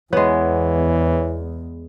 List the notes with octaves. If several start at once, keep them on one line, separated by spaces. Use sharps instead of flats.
E2 E3 G#3 B3 C#5